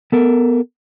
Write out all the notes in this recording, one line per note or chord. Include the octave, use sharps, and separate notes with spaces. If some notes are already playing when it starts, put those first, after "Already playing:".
B3 A4 A#4